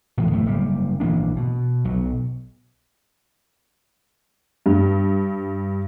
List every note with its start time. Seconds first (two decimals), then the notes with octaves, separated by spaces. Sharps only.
0.18 A2 E3 F3 G#3
0.31 B1 A2 D#3 A3
0.46 F#1 G3 A#3
1.00 A#1 E3 A#3 D4
1.36 B2
1.85 B1 F#3
4.66 G2